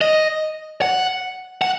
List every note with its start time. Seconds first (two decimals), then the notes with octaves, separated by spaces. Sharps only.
0.01 D#5
0.82 F#5
1.62 F#5